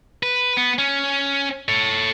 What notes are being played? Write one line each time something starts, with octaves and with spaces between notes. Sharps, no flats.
B4
B3
C#4
A4 C#5